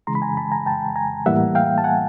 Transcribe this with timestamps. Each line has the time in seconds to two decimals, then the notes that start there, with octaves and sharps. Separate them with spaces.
0.07 C#3 E3 G#3 A#5 C6
0.15 B5
0.22 G#5 A#5
0.37 A5 B5
0.52 G#5 A#5
0.66 G5 A5
0.96 G#5 A#5
1.26 A2 E3 G3 A#3 E5 F#5
1.55 F5 G5
1.78 A5
1.84 F#5 G#5